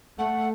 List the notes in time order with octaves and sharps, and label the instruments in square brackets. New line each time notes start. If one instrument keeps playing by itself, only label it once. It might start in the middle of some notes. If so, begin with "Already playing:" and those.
[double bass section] A3 [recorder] F#5